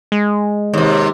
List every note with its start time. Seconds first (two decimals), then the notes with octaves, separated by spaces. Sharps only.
0.12 G#3
0.74 D#2 C3